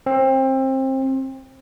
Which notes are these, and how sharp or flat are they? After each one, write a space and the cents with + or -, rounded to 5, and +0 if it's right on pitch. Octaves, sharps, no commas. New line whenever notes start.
C4 +25